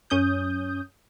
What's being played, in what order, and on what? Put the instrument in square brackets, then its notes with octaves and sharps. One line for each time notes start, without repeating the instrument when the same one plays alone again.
[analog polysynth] F#2 C#4 D#6 G6